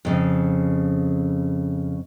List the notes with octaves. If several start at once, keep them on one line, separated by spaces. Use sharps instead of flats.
F2 C#3